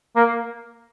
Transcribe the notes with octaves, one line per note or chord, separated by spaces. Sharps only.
A#3